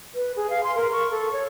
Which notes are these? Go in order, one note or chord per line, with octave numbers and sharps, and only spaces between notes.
B4
G#4
F5
C6
A#4
C#6
A4
C#5